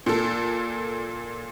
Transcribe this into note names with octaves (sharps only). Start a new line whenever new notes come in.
A#2 A4